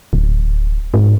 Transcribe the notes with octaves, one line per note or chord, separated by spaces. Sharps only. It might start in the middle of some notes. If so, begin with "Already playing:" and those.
D1
G#2